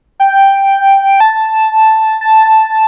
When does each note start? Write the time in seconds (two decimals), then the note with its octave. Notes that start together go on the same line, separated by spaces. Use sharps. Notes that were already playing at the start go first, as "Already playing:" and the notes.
0.20 G5
1.20 A5
2.21 A5